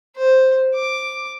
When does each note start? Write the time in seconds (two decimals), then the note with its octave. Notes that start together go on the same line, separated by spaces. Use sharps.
0.16 C5
0.75 D6